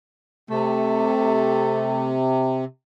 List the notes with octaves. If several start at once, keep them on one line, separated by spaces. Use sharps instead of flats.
C3 A3